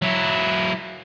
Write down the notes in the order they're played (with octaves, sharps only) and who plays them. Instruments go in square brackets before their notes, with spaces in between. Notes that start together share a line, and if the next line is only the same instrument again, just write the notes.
[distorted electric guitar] F#3 E4